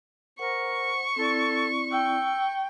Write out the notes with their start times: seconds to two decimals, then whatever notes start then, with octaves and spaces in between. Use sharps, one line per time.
0.39 A#4 C5 F#5 C#6
1.16 C4 E4 A4 D5
1.92 G5 E6